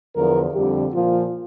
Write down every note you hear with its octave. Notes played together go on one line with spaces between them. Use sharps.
E2 D3 F3 A#4
F2 D3 G3 G4
A#2 F3 F4